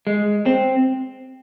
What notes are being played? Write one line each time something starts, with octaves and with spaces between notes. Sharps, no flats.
G#3
C4